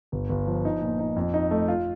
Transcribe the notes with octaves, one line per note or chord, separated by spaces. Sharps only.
G1
G1
F3
D#4
A#2
D#4
F2
D#4
A3
F4